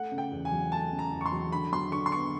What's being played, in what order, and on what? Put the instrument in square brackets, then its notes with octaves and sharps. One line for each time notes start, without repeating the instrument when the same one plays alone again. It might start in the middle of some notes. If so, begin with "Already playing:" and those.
Already playing: [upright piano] A3 [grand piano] F#5
[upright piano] C#3
[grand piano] G5
[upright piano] E2
[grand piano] G#5
[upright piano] F#3
[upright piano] A3 [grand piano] A5
[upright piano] C#3
[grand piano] A#5
[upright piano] E2
[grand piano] C#6
C6
[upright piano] F#3
[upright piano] D3 [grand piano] B5
[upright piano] F#3 [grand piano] C6
[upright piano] D3 [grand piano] C#6
[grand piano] C6
[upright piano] B3 [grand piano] C#6